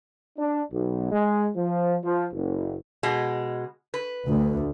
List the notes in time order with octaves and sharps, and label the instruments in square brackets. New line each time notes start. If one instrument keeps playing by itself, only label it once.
[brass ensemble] D4
B1
G#3
F3
F3
F#1
[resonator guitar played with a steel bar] B2 G#3
B4
[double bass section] D2